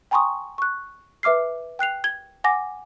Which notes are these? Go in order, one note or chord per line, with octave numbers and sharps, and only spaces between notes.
G5 G#5 A#5 C6 C#6 D#6
C#6 F#6
B4 E5 D6 F6 C7
G5 F#6 C7 F7
G#6 G7
F#5 G#5 D6 A#6